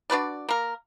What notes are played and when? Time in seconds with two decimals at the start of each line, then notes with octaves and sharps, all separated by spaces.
0.10 D4 F#4 B4 D5
0.49 A#3 A#4